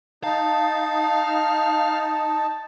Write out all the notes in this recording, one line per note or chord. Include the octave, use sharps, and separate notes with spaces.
D#4 F5 A5